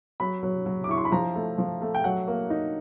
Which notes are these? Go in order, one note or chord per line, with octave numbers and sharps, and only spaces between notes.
F#3 B5
F#3
F#3
D6
E4 C#6
C6
B5
F3 A#5
A3
F3
A3
G5
F#3 F#5
A#3
D#4